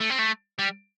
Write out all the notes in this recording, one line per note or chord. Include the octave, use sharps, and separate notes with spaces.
A3
C4
A3
G3